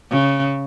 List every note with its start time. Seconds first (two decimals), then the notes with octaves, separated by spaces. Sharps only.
0.10 C#3